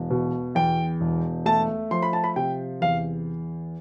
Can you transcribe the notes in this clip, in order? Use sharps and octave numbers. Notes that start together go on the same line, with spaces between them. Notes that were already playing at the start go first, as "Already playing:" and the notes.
Already playing: E1
B2
E2 G5
E1
A3 A5
F3 C6
B5
A5
B5
C3 G5
E2 F5